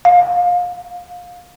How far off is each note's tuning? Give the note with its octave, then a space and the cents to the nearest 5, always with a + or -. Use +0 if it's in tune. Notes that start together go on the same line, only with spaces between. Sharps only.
F5 +25